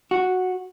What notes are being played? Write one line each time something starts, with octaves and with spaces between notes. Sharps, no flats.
F#4